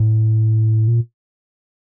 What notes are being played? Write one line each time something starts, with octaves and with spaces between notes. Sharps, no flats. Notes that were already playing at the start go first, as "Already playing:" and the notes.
Already playing: A2
A#2